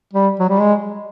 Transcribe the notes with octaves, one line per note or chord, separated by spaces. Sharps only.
G3
F#3
G3
G#3